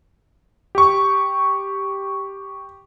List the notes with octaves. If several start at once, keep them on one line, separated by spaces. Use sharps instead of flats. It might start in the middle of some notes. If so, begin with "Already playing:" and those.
G4 C#6